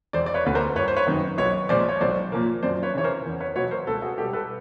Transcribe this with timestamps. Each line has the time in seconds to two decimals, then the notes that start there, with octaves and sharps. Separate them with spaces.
0.13 E1 C5 D5
0.26 D5
0.34 B4 C#5
0.45 D2 D3 B4
0.55 A#4 C5
0.75 G1 B4 C#5
0.88 C5
0.97 B4 C#5
1.07 F#2 D#3
1.38 B1 B4 C#5
1.69 A#2 F3 G#3 C5 D5
1.89 C#5
2.01 B1 C5 D5
2.32 A#2 F3 A#3
2.63 F#2 C5 D5
2.83 B4 C#5
2.94 C#3 E3 C#5
3.04 A#4 C5
3.25 E2
3.40 B4 C#5
3.56 B2 F#3 B4 C#5
3.71 A#4 C5
3.87 C#2 A4 B4
4.02 F#4 G#4
4.18 B2 G3 G4 A4
4.33 A4 B4